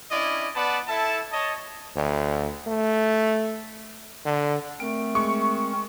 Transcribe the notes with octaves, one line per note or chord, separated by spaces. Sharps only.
C#4 D4 E4 D5 D#5
B3 B4 D5 F#5 A5
E4 A4 E5 A5
C#5 D#5 A5
D2
A3
D3
A3 C4 A#4 D7
G#3 C#6